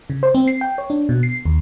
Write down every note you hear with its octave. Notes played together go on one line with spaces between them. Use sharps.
C#3
C5
C4
C7
G5
C#5
D4
B2
C7
D#2